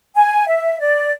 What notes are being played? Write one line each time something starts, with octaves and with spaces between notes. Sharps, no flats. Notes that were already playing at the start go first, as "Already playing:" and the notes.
G#5
E5
D5